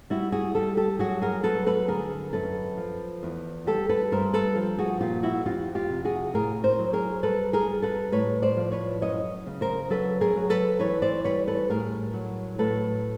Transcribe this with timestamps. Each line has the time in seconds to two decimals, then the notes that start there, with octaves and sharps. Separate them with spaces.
0.10 G3 E4 F#4
0.32 F#4 G#4
0.55 G3 G4 A4
0.77 G4 A4
0.99 F#3 F#4 G#4
1.22 G#4 A#4
1.43 F#3 A4 B4
1.66 A4 B4
1.88 D3 G#4 A#4
2.33 F#2 A4 B4
2.77 F3
3.23 E2
3.66 G3 G4 A4
3.89 A4 B4
4.12 G2 A#4 C5
4.34 A4 B4
4.56 F3
4.78 F#4 G#4
5.01 A#2 F4 G4
5.23 E4 F#4
5.46 F2 F4 G4
5.75 F4 G4
5.90 C3
6.05 F#4 G#4
6.34 A2 G#4 A#4
6.64 A#4 C5
6.79 F#3
6.93 G#4 A#4
7.23 G3 A4 B4
7.53 G#4 A#4
7.68 G3
7.82 A4 B4
8.12 A2 B4 C#5
8.42 C5 D5
8.57 F3
8.72 B4 C#5
9.01 F#2 C#5 D#5
9.46 C#3
9.61 A#4 C5
9.90 F#3 A4 B4
10.21 G#4 A#4
10.36 F#3
10.50 A4 B4
10.79 E3 B4 C#5
11.02 C5 D5
11.24 G3 B4 C#5
11.47 A4 B4
11.69 A2 G#4 A#4
12.14 F#3
12.58 A2 A4 B4